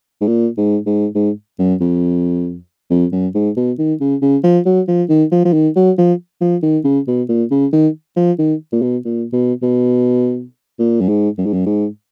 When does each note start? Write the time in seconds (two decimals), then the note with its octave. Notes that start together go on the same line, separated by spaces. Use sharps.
0.21 G#2
0.27 A#2
0.58 G#2
0.86 G#2
1.15 G#2
1.59 F#2
1.80 F2
2.90 F2
3.12 F#2
3.34 G#2
3.56 B2
3.78 D#3
4.00 C#3
4.22 C#3
4.44 F3
4.65 F#3
4.88 F3
5.09 D#3
5.31 F3
5.45 F3
5.53 D#3
5.76 F#3
5.98 F3
6.41 F3
6.63 D#3
6.84 C#3
7.07 B2
7.28 A#2
7.51 C#3
7.72 D#3
8.16 F3
8.39 D#3
8.72 A#2
8.82 B2
9.04 A#2
9.33 B2
9.62 B2
10.79 A#2
11.01 F#2
11.08 G#2
11.38 F#2
11.46 G#2
11.53 F#2
11.66 G#2